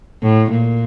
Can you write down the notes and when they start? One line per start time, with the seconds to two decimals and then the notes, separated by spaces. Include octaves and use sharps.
0.23 A2
0.51 A#2